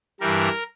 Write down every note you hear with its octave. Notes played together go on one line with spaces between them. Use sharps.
G2 E3 G3 A#4